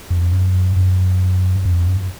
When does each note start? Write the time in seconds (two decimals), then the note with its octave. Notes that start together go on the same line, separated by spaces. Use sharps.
0.10 F2
0.32 F#2
0.76 F#2
1.65 F2
1.87 F#2